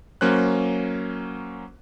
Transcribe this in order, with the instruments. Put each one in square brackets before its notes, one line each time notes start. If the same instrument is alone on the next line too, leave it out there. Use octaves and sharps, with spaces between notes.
[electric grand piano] F#3 A#3 C#4 C5 F#6